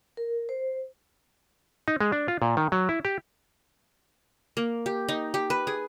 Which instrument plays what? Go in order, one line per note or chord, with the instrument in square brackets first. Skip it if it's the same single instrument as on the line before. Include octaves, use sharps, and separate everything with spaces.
[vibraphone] A#4
C5
[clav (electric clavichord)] D#4
G#3
D4
F4
A#2
D#3
F#3
E4
G4
[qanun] A#3
G4
D#4
G4
B4
G#4